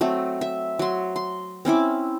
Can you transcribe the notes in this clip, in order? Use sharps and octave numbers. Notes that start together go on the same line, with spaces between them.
F#3 A3 C4
E5
F#3 C6
C6
C4 C#4 E4 D6